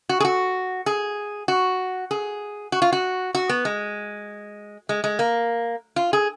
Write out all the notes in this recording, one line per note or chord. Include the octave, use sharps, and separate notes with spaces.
F#4
G#4
F#4
G#4
F#4
G#4
F#4
F4
F#4
F#4
B3
G#3
G#3
G#3
A#3
F4
G#4